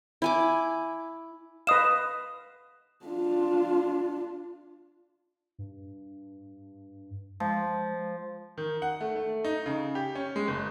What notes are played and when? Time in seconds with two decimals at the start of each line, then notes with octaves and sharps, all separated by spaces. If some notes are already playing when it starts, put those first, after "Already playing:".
0.22 E4 G#5 D6
1.67 B4 D#5 F5 D#6 E7
3.05 D4 F4
5.59 G2
7.40 F3 G#3
8.58 D#3
8.82 F#5
9.01 A3
9.16 A3
9.45 D#4
9.66 C#3
9.95 G4
10.15 C#4
10.36 G#3
10.48 F#1